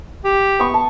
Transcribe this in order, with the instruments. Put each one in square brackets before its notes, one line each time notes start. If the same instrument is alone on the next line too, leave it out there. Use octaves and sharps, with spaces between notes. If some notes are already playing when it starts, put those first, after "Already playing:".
[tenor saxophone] G4
[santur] B3 C#6
A5